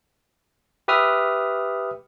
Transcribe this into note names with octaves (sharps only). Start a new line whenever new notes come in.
G4 B4 E5 D#6 F6